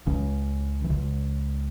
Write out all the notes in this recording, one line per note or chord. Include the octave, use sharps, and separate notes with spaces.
C#2 C#3
E3
C#2 C#3